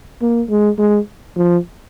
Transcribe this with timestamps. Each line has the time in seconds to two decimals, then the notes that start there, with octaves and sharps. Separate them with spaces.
0.22 A#3
0.49 G#3
0.78 G#3
1.37 F3